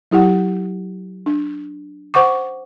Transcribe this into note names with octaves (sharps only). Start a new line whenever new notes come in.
F#3 E4 G4 F#5
D4
C5 F#5 C#6 D6